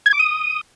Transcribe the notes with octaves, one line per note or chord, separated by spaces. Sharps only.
G#6
D6
D#6